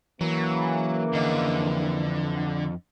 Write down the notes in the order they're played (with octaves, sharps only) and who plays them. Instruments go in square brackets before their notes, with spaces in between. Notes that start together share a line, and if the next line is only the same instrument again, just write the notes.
[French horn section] C#3 A#3 [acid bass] E3 [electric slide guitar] F#3
[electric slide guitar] F2 D#5 F5 [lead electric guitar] D3